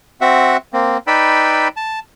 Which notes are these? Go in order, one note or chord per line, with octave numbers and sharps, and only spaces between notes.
C4 F#4 E5 F#5
A#3 C4
D#4 B4 D5 G5 B5 E6
A5